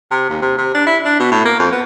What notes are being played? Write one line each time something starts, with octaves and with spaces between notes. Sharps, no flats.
C3
D#2
C3
C3
D4
E4
D4
B2
A2
A#3
F2
B3